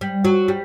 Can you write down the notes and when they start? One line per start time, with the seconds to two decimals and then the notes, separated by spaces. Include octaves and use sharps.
0.01 G3
0.25 F#3
0.48 G3